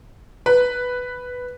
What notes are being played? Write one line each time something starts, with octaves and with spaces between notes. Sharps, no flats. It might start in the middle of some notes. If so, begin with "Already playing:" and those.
B4